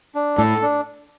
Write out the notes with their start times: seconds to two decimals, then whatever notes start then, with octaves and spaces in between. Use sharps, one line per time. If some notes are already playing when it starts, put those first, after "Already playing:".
0.15 D4
0.38 A2 A4
0.62 D4